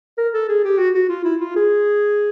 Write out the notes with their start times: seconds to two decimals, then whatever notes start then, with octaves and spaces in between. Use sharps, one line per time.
0.18 A#4
0.34 A4
0.49 G#4
0.64 G4
0.79 F#4
0.95 F#4
1.09 F4
1.25 E4
1.41 F4
1.56 G#4